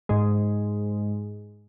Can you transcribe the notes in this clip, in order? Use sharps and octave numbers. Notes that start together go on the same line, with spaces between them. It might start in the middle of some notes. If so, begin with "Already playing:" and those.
G#2 G#3